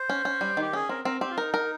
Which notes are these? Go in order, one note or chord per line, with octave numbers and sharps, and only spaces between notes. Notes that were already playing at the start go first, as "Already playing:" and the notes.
Already playing: C5
C#4
C#4
G3
D#3 G4
C#4 G#4
C4 A#4
C4 A#4
C4 G4
F4
D#4 A#4
A#4